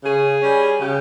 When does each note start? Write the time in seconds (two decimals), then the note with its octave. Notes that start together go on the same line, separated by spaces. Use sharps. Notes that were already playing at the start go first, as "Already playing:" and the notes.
0.04 C#3 G#4
0.42 G3 C#4
0.81 C#3 G4